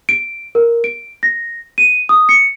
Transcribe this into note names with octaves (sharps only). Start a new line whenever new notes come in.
D7
A#4
D7
A#6
D#7
D#6
C#7